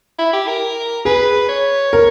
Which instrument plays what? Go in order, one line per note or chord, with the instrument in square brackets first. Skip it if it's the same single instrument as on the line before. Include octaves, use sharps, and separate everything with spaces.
[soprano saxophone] E4
G4
A#4
[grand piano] G#4 [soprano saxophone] B4
[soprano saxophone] C#5
[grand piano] A#4